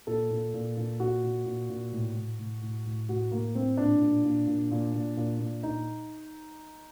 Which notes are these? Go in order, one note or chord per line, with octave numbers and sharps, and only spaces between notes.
A#2 A4
A#2
A#2
A#2
A#2 F#4
A#2
A#2
A#2
A2
A2
A2
A2
A2
A2 F#4
A2 A#3
A2 C4
A#2 D4
A#2
A#2
A#2
A#2
A#2
A#2
A#2
A#2 D#4